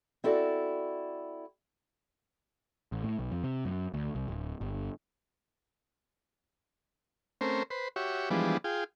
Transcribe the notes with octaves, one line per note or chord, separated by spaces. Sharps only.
C4 E4 F#4 A4 D5
A1
A2
B1
F2
C3
F#2
D2
C2
D1
G1
A3 C4 C#4 A#4 C5
B4 C5
F#4 G4 C#5 E5
E3 F3 G3 G#3 B3 D4
F4 G#4 G5